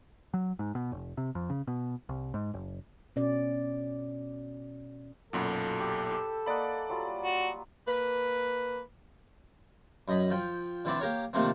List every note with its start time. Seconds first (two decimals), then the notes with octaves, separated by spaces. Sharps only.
0.34 F#3
0.59 G#2
0.75 B2
0.92 F1
1.17 C3
1.35 F2
1.50 C#3
1.67 B2
2.09 C2
2.34 G#2
2.54 F#1
3.16 B2 C#4 D5
5.33 B1 F#2 A#2 F#4 A4 B5
5.80 G4
6.12 G4 E6
6.46 A#3 D5 D#5 F#5 B5
6.89 F#3 G3 F4
7.24 F#4
7.87 A#3 B4
10.08 F#2 D#5 B5
10.30 F3 G5
10.85 D3 E3 C4 D5 E5
11.00 A#3 G4 A#4 C#5
11.33 C3 D#3 F3 A3 A#3 C4